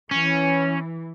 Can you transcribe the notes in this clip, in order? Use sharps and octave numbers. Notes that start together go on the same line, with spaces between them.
E3 C#4